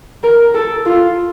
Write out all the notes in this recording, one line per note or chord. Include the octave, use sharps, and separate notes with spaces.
A#4
A4
F4